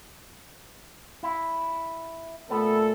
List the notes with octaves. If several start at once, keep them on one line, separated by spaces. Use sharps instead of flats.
E4
A#2 A3 B3 A4